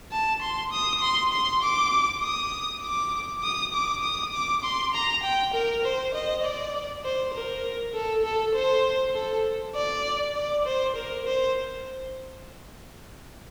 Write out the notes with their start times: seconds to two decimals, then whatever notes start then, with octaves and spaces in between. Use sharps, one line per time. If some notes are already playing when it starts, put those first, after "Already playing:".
0.12 A5
0.42 C6
0.72 D#6
1.03 C6
1.32 C6
1.62 D6
2.23 D#6
2.83 D6
3.43 D#6
3.74 D6
4.03 D#6
4.34 D6
4.64 C6
4.94 A#5
5.23 G5
5.53 A#4
5.84 C5
6.14 D#5
6.44 D5
7.05 C5
7.34 A#4
7.94 A4
8.24 A4
8.55 C5
9.14 A4
9.75 D5
10.35 D5
10.65 C5
10.96 A#4
11.26 C5